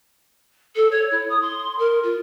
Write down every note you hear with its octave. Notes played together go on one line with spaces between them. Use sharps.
A4
C#5
E4
D#6
C6
A#4
F4